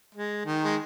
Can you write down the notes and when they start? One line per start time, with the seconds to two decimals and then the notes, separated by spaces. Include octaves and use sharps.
0.15 G#3
0.45 D#3
0.64 G#3